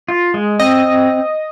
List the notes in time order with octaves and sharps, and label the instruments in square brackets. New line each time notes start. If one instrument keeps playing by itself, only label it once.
[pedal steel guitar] F4
G#3
[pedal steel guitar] C4 [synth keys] D#5